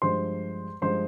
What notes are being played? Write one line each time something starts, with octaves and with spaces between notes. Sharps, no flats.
G2 F3 G#3 C5 C6
G2 F3 G#3 C5 C6